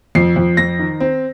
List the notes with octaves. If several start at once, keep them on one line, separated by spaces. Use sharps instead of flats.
F2 C7
F2
F2 A#6
D#3
C4